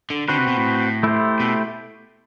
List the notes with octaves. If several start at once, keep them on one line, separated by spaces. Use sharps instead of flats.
D3
D3 C4 F#4 B4
C3
B2
A2
A3 E4 G4 C5
B2